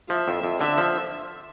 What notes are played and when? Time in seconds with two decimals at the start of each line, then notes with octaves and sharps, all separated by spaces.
0.10 F3 E5
0.28 F2
0.43 F2
0.61 D3 E5
0.78 F3